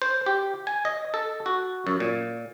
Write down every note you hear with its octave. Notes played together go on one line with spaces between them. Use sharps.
C5
G4
G#5
D#5
A4
F#4
F#2
A#2